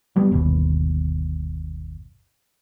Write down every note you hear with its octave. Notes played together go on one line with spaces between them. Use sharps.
F#3 G3 B3
G1 D#2 B2